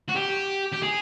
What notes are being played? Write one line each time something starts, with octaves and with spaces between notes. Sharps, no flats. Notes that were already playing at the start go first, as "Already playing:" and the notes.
F#4
G4
G4
G#4